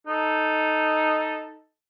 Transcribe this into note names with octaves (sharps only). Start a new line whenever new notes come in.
D#4 A4